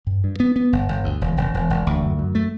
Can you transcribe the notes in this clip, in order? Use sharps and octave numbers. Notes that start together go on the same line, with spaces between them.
G2
G2
B3
B3
G1
G1
D2
E1
E1
E1
E1
D2
F#2
F#2
A3